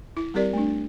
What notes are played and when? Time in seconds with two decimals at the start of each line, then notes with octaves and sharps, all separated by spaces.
0.17 E4
0.34 G3 C4 G4 A#4 D5
0.53 A3 D4